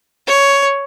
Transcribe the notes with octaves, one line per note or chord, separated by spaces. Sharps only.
C#5